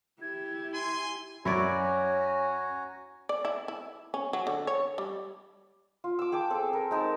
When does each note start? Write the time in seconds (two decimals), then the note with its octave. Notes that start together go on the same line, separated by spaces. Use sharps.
0.21 E4 G4 G#6
0.74 G#5 C6
1.45 F#2 C#4 E4 F#4 C#5 D5 G#5 A#5
3.29 D5
3.45 E4
3.68 E4
4.14 C#4
4.33 F#3
4.47 D3
4.67 C#5
4.98 G3
6.04 F4
6.19 D6 E6
6.32 G#4 G5 A5 D6
6.50 C4 G#4 A4
6.73 A#4
6.91 G#3 D#4 C5 A5